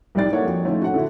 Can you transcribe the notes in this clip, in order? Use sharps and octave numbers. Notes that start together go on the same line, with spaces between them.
C2 G3 D#4 D5 A6
A#3 E4 A4 C#5 F#5
F2 F#4
D#3 F3 A3 C#4 D#4 E4
F#4 A4 F#5
D3 E4 F#4